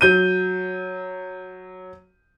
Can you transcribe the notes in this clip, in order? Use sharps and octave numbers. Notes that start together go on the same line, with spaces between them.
F#3 G6 D#7